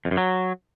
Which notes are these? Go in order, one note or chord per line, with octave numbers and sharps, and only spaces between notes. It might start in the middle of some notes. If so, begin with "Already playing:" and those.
F2
F#2
F#3